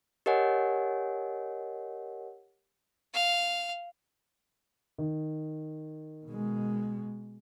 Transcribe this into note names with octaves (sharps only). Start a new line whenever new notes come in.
G4 A#4 C#5 D#5 F#5 G#5
F5
D#3
B2 G#3